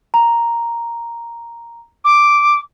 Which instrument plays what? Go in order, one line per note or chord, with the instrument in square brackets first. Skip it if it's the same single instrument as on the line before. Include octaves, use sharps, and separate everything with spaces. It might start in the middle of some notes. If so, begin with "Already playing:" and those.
[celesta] A#5
[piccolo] D6